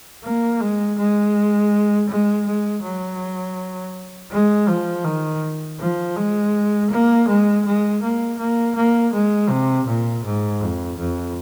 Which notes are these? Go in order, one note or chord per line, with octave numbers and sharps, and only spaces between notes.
A#3
G#3
G#3
G#3
G#3
F#3
G#3
F3
D#3
F3
G#3
A#3
G#3
G#3
A#3
A#3
A#3
G#3
C3
A#2
G#2
F2
F2